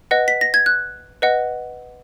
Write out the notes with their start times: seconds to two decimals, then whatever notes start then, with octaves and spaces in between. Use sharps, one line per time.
0.11 B4 D#5 F#5
0.28 B6
0.41 A#6
0.54 G#6
0.66 F#6
1.22 B4 D#5 F#5